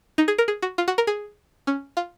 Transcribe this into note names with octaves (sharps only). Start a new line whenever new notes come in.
D#4
G#4
A#4
G#4
F#4
F4
F#4
A#4
G#4
C#4
F4